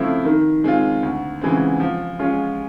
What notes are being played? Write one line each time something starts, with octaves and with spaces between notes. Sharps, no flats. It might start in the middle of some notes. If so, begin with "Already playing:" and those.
Already playing: C#3 F3 A3 C4 E4
D#3
G#3 C4 F4
D2
C#3 E3 G#3 C4
F3
G#3 C#4 F4